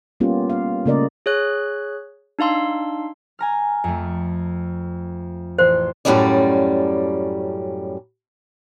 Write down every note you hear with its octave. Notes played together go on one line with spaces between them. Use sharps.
G3 A#3 B3 C#4 F4 G4
F5
C#3 A3 A#3 A#4 D5 D#5
G#4 C#5 F#6
D4 D#4 F5 C6 E6
G#5 A#5 F6
F2 A3
A1 C5 C6
F#2 A2 C3 G3 C#4 D5